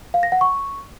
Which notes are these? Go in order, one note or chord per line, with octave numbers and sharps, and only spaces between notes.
F5
A#6
F#5
C#6